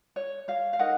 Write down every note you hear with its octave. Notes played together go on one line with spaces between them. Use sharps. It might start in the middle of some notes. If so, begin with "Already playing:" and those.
C#5
C#5 F5
F5
D#4 A#4 D#5 F#5